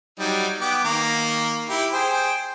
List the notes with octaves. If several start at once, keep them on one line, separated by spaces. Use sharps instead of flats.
F#3 G3 D#4
B3 G5 D6
D#3 A#3
E4 G4
G#4 C5 G5